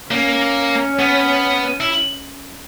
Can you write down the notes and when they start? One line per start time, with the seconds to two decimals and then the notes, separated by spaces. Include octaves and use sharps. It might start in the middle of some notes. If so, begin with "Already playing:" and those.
0.11 A#3 C#4
0.99 B3
1.80 E4